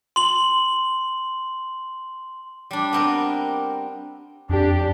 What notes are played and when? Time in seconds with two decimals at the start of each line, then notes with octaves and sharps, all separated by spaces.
0.16 C6 F#7
2.71 G3 D4
2.93 B3 C4 A#4
4.49 F2 D4 G4